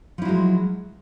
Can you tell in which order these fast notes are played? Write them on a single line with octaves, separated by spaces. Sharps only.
F3 E4 F#3 G#3